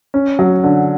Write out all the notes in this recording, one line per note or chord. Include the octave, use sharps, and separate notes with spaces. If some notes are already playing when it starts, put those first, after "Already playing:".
C#4
F#3
D3